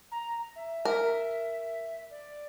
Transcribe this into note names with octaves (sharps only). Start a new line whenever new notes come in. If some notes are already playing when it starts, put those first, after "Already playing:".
A#5
E5
A#4
D5